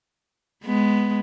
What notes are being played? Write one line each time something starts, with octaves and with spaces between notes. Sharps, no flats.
G#3 B3